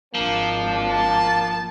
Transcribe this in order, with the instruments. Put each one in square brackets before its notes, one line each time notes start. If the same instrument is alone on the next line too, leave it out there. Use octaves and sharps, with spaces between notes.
[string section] G#1 D4 [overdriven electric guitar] F3 [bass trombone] A#3
[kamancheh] A5